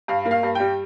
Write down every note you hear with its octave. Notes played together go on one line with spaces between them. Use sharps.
G2 F5
A#3
F5
G2
G3 G5